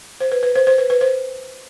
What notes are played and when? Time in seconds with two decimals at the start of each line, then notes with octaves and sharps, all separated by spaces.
0.21 C5
0.32 B4
0.43 B4
0.55 C5
0.67 C5
0.78 B4
0.90 B4
1.01 C5